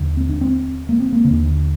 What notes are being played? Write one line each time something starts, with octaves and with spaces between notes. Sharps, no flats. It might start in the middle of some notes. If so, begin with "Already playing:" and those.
Already playing: D#2 D3
C4
D4
C4
A#3
C4
A#3
D3
D#2